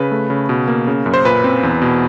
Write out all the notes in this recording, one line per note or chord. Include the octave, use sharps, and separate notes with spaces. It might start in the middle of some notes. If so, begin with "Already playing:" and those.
Already playing: C#3 B4
A3
C#3
B2
A#3
C#3
F#2
C5
A#2 B4
C4
E2
B2